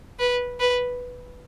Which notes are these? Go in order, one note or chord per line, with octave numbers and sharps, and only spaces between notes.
B4
B4